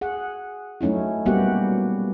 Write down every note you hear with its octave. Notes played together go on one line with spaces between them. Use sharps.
G#4 F#5
F#3 A3 C#4 D#4 E4
G3 A#3 B3 F#4 G4 F#5